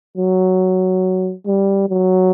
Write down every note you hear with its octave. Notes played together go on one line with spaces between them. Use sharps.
F#3
G3
F#3